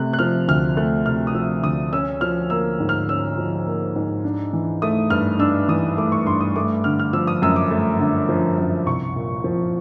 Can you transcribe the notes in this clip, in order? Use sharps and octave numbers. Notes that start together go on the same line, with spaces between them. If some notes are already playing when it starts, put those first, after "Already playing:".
Already playing: C3 A3 F#6
F#6
F3 F6
D2 F6
A3 F#6
C3 F6
D#6
F3 E6
D2 D#6
C#4 E6
F3 F6
A#3 E6
G#2
F6
C#4 E6
F3
A#3
G#2
D4
E3
A3 D#6
G2 F6
D4 E6
E3 D#6
A3 D6
C#6
G2 C6
D#6
A3 D6
D3 F6
F6
F3 E6
D#6
F#2 E6
D6
A3
D3
F3
F#2
C2 C#6
A#2
F3